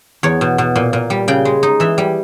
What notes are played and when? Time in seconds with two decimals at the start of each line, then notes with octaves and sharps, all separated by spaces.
0.23 E2 C#5
0.41 B2
0.58 B2
0.76 A#2
0.93 A#2
1.10 G3
1.28 C#3 G5
1.45 G#3
1.63 D#4
1.80 E3 E5
1.98 G3